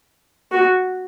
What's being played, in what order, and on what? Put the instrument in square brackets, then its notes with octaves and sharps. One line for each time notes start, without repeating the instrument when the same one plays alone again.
[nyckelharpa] F#4